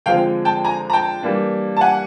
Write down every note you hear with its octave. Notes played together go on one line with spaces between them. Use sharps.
D3 F3 G#3 C4 F5 G5
G5 A5
G#5 A#5
A#5
G5 A5
E3 G3 A#3 D4
A5
F#5 G#5